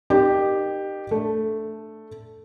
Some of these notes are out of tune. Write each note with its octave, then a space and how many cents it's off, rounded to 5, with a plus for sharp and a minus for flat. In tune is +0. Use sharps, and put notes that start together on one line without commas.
D#4 -30 G4 +0 A#4 +0
A3 +0 D4 +0